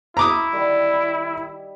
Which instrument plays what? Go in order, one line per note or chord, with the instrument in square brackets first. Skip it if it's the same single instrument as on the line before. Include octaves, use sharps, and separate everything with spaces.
[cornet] E4 [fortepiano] A#5 D6 D#6
[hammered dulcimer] D#3 G3
E5